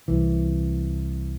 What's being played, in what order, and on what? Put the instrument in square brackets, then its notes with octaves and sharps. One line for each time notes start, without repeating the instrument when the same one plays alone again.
[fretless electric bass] C2 E3